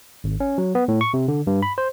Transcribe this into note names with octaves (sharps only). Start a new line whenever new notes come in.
G#1
C#4
F#3
B3
A2
C#6
C3
D3
G2
B5
C5